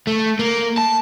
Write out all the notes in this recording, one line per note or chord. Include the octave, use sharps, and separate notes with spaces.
A3
A#3
A5